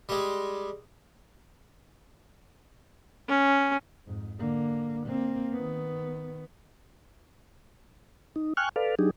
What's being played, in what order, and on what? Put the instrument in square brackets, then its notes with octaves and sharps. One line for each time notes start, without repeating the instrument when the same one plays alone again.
[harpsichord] G3 G#3
[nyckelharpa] C#4
[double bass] F2 G#2
D3 A#3
A#3 C4
D#3 B3
[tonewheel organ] D#4
G5 G#5 C#6 F6 F#6
A4 B4 D5 F5
F#3 D4 D#4 G4 G#4